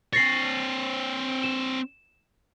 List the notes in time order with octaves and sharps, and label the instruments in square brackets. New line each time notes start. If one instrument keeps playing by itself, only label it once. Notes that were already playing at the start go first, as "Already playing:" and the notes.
[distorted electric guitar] C4 C#5 [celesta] A6 A#6 C7
[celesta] E7